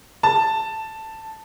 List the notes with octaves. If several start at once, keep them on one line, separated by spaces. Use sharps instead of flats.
A5